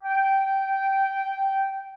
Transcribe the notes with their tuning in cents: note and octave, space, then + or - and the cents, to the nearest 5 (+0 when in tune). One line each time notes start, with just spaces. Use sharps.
G5 -15